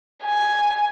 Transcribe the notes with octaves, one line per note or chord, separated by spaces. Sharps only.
G#5